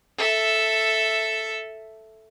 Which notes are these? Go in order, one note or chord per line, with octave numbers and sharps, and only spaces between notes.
A4 E5